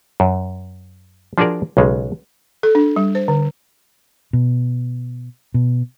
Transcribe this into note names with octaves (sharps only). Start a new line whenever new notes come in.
F#2
F3 D4 F#4 G#4 A#4 D5
B1 C#3 G#3
A4
D4
G3
C5
D3
B2
B2